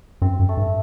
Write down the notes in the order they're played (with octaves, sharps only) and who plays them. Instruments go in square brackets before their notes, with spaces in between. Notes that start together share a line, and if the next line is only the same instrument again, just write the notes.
[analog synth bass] F#2 [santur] C4
[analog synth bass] F#2
[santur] A3
[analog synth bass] G2